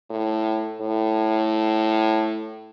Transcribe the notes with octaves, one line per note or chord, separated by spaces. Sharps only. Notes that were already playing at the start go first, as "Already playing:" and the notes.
A2
A2